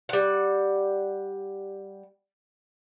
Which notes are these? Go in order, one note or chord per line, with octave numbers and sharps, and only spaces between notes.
G3 F#5